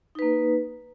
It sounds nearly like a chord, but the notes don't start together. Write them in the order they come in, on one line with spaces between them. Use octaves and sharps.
D#4 B4 A#3